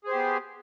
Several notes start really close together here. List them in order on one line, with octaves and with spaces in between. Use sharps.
G#4 C5 G4 B3